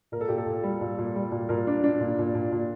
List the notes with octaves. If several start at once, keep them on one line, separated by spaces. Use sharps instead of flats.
A#2 A#4
A4
A#2 G4
A4
A#2
G3
A#2
A#2
G3
A#2
A#2 A#4
D4
D4
A#2
A#2
A#2
A#2